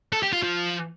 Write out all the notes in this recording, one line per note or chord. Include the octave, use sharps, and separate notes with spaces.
A4
G4
F4
F3